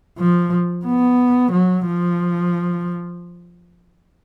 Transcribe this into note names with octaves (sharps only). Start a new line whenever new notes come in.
F3
B3
F#3
F3